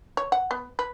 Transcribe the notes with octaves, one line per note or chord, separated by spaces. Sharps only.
C#5
F#5
B3
B4